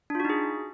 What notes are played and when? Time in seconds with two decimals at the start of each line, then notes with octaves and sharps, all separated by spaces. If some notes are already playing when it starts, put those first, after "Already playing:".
0.10 D4
0.15 F4
0.20 F#4
0.25 D#4
0.30 G#4